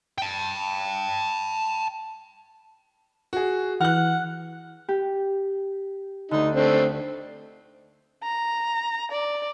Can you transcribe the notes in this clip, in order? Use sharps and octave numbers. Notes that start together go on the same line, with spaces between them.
G5 A5
F#4 G#4
E3 F#5 F6 F#6
G4
D2 D3 D#4
A3 C4 D4
A#5
D5